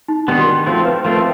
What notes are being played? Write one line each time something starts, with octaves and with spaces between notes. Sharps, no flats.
D#4
D#3 G3 B3 D4
F#4
G4
F3 A3 C4 C5
B4
F3 A3 C4 A#4